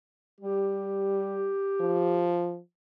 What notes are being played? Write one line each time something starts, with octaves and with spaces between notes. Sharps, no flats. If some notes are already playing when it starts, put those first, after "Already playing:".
G3 G4
F3